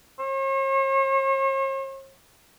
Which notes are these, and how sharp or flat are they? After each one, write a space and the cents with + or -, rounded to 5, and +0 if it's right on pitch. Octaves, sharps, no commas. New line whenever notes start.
C#5 -45